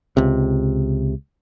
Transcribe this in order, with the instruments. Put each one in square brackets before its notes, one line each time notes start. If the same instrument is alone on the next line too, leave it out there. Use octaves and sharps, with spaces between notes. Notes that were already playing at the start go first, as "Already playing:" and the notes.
[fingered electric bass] C#2 C3